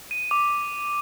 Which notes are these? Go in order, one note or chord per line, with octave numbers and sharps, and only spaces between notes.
D#7
D6